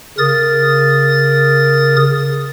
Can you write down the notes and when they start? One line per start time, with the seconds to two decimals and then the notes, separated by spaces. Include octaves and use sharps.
0.18 C#3 A#4 D#6 A6